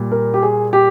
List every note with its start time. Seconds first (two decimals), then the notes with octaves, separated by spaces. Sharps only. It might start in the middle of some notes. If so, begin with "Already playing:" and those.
Already playing: A#2 G3
0.12 A#4
0.34 G4
0.42 G#4
0.73 G4